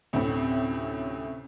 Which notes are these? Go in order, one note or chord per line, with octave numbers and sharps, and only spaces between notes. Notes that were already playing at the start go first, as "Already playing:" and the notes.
D2 A2 C3 C4 C#4